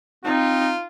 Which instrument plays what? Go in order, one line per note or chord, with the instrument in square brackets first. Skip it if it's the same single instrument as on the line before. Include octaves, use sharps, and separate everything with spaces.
[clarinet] C4 [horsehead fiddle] D#4 [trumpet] F4